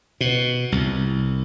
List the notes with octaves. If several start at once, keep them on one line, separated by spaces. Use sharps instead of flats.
B2
C2